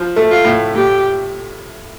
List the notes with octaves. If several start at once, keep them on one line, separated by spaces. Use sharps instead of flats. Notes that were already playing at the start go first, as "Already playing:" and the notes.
Already playing: F3
A3
F4
A2
A2 G4